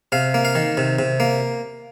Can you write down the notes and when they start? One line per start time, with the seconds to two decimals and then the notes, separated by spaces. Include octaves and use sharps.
0.12 C3 F5
0.34 A#3
0.45 F5
0.55 D#3
0.77 C3
0.99 C3
1.20 A#3